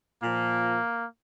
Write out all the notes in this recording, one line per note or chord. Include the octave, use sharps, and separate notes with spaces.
A#2 F3 A#3